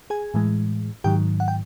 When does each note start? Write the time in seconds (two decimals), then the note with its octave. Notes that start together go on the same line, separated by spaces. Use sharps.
0.10 G#4 G#5
0.34 A2 E3 G#3
1.04 G#2 D#3 F#3 G4 G5
1.40 F#5
1.48 G5